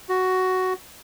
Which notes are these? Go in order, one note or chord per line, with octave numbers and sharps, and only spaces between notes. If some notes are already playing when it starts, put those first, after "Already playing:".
F#4